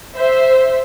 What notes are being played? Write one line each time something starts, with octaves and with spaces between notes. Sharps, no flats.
C5 E5